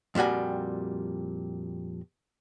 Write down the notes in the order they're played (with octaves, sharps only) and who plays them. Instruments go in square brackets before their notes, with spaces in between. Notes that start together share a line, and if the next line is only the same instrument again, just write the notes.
[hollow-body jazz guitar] F2 A#2 G3 F#4 G#5